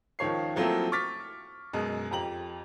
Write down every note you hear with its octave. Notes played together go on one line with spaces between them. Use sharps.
C#2 D#3 F3 C#5 C7
F3 F#3 A3 A#3 C4 E4
C#6 D6 F6 A6 B6
F#2 B2 G#3
F2 G4 A#5 F#7